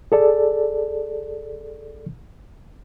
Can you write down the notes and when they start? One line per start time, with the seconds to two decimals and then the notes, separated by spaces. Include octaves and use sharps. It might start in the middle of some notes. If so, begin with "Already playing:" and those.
0.12 G#4 A4 D5